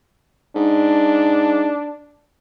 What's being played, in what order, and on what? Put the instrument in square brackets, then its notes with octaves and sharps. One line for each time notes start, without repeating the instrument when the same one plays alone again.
[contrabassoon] G#2 [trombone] D4